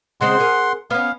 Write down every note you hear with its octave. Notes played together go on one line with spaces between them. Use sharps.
C#3 G#3 C4 F#5 C6
G#4 A#4
B3 C#4 F5